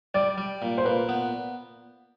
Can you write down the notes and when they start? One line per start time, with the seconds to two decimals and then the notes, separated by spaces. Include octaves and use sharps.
0.14 G3 D5
0.38 G3
0.62 A#2
0.78 C5
0.85 A#2 B4
1.09 B3